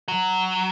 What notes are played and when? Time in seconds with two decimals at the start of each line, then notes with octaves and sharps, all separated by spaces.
0.08 F#3